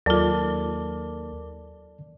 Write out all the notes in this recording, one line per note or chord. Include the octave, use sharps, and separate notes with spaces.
D#2 F#3 F4 A4 A#4 D5 A5 D6